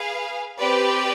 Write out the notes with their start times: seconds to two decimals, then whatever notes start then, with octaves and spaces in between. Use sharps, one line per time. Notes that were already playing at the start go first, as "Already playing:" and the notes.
Already playing: G#4 B4 F5
0.59 C4 G4 B4 D5